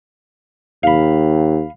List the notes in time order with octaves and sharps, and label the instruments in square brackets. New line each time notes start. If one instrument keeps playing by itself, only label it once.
[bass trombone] D#2 [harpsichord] F5 B5